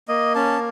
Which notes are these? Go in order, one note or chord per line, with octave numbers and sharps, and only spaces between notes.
A#3 D#5
C#4 A5